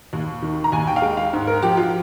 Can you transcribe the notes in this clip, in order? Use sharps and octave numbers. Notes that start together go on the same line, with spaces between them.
D#2
D#3
A#5
D#2 G#5
G5
F5
G#3 G5
F5
G#2
A#4
F3 G4
F4